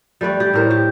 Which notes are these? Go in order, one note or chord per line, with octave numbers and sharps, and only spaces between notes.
G3 A3 B4 D5
G4
A2 A#4 C5
G4